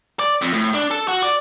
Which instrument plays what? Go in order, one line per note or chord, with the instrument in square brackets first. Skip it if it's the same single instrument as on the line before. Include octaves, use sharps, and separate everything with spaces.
[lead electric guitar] D5
F2
A2
D4
A4
F#4
D5